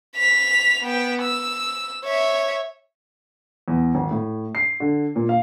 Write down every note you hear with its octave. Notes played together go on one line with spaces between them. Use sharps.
B6 F7
B3 G5
E6
C#5 E5
E2
G#1
A2
C7
D3
A#2
F5